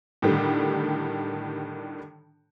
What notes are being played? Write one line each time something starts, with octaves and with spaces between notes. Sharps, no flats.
A2 D3 D#3 G3